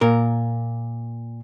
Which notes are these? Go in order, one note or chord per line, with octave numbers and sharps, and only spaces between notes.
A#2 A#4